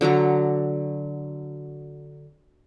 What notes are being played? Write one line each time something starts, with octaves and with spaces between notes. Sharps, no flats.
D3 F#3 D5 A#5